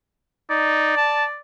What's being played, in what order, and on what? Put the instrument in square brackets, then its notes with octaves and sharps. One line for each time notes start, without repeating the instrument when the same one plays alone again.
[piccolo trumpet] D#4 [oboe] D5
[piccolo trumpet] A5